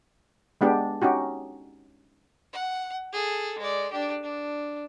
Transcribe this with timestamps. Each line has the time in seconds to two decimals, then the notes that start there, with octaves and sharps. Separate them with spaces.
0.61 G#3 B3 D4 G4
1.01 C#4 D#4 F#4 G4
2.53 F#5
3.13 G#4 A4
3.58 G#3 D5
3.92 D4 G4
4.23 D4